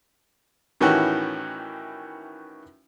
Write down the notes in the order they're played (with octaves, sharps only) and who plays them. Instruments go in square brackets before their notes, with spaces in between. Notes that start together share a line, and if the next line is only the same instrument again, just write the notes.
[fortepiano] A2 D#3 E3 C#4 F#4 G4